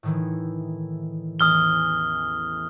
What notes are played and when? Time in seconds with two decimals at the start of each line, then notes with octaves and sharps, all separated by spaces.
0.03 A2 D#3 E3
1.40 A1 E2 D#6 F6 G7